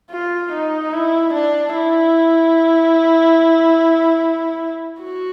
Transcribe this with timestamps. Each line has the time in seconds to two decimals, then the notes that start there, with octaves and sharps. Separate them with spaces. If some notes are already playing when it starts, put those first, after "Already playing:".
0.11 F4
0.52 D#4
0.93 E4
1.34 D4
1.74 E4
5.02 F#4